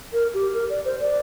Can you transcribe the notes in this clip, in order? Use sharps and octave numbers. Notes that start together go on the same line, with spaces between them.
A#4
G4
A#4
D5
C5
D5